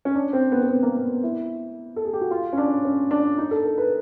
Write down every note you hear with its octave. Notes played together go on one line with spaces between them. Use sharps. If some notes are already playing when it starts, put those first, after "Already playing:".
C#4
D4
C4
B3
B3
C4
A#3
A#3
B3
E4
A4
G#4
G4
F#4
F4
C#4
D4
C#4
D4
D#4
A4
A#4
B4